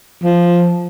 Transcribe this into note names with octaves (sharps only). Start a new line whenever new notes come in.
F3